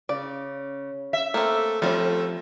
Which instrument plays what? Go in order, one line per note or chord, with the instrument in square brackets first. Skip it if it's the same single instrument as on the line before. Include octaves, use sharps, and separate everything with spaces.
[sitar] C#3 [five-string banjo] D5
[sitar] E5
[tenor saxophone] A3 [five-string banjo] A#3 C4
[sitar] F3 C4 [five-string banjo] G3 F4 [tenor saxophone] A3